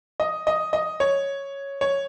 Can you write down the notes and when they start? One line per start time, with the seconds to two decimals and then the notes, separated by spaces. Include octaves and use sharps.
0.20 D#5
0.47 D#5
0.73 D#5
1.00 C#5
1.81 C#5